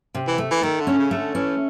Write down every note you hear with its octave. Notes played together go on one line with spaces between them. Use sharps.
C3
E3
A3
E3
D#3 A3
D3
C#4
C#3
A3
D3
E3 C#4